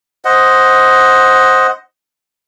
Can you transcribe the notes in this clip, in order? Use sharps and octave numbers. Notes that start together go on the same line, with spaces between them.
C5 D#5 F#5